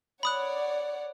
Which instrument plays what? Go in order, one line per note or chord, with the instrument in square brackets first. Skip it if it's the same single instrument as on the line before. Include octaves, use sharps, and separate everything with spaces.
[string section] C#5 D5 F#5 [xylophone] B5 D#6 F#6